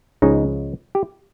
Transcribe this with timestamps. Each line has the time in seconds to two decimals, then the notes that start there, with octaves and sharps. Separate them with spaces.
0.22 C#2 C#3 F3 G#3 D#4
0.95 G4